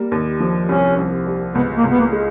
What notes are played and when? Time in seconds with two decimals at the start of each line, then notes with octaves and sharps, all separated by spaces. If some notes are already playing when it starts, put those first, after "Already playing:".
Already playing: G3 A#3
0.12 D#2
0.40 F3
0.69 C2 C#4
0.98 C2
1.27 G3
1.55 C#2 B3
1.77 A#3
1.84 C#2
1.89 B3
1.97 A#3
2.13 G#3